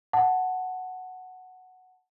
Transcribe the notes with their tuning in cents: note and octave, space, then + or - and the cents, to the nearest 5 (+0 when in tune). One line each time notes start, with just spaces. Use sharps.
F#5 +0 A5 +0